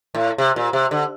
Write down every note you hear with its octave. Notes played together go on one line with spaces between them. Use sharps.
A2
C3
A#2
C3
D3